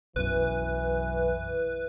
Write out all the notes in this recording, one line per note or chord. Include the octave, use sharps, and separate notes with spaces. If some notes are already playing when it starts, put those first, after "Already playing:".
B1 F#2 E3 B4